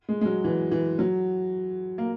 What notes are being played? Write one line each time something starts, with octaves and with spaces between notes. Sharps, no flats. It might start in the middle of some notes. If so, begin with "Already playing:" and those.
G#3
G#3
F#3
E3
E3
F#3
A#3